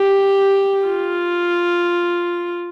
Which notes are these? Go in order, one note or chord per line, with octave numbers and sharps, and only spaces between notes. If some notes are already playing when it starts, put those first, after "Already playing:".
Already playing: G4
F4